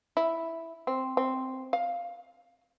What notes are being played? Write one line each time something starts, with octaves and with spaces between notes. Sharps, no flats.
E4
C4
C4
F5